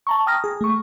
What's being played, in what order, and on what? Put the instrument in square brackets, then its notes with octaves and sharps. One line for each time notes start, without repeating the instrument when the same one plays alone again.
[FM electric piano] A5 A#5 C#6
G5 D#6 F6 A#6
G#4
A3 C#6